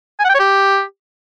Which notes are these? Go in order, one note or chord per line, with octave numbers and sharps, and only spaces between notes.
G#5
F#5
G5
C#5
G4